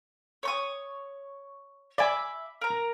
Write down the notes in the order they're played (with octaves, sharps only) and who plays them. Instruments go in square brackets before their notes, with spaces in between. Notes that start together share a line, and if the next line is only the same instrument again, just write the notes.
[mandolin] C#5 C#6 D#6
[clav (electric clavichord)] D5 G#5 [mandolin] E5 B5 D6
[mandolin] A#4 A#5